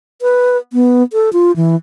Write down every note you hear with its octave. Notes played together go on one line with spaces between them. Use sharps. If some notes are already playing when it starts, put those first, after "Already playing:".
B4
B3
A4
F4
E3